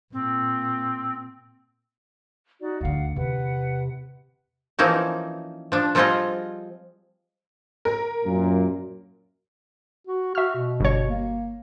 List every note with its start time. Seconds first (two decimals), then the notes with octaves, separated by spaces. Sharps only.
0.13 A#2 C4
2.61 D#4 F#4 D5
2.81 D2 D3 D#3 F5 F#5
3.16 E2 C3 B4 F#5
4.79 E3 F3 A#3 C4 C#4 D#4
5.72 F3 D4
5.95 F3 G3 C4 F4 G#4 D#5
7.85 A#4
8.24 F#2 A#2
10.07 F#4
10.35 F#4 E5 F6
10.56 B2
10.80 G1 C#5
11.09 A#3